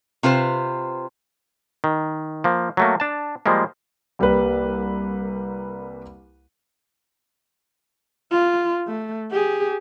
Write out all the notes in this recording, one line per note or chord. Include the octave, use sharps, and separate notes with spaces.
C3 F4 B4 C5
D#3
F3 A#3
F#3 A3 A#3
D4 A5
F3 G3 G#3 A#3
C2 G3 A#3 B4
F4
A3
G4 G#4